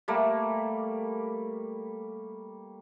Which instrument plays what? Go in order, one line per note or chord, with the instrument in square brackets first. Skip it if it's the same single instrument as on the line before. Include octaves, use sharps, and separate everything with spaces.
[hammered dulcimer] G3 A3 A#3